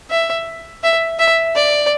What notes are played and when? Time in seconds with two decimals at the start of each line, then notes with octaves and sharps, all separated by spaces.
0.10 E5
0.83 E5
1.19 E5
1.55 D5